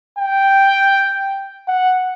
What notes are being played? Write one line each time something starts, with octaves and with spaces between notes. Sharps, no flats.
G5
F#5